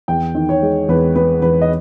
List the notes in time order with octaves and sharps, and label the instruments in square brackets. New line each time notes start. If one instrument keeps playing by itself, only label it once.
[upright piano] E2 G5
D#3
C#5
G#3
E2 B4
B3 B4
E2 B4
D#5